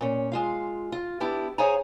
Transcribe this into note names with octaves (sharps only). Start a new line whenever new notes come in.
A#2 C#4
G#3 F4 F5
F4
B3 D4 E4 G4
G#4 C5 C#5 F5 G#5 A#5